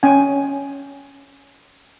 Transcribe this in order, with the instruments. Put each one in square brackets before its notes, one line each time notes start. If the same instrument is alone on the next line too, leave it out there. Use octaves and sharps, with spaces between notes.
[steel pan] C#4 G5 G#5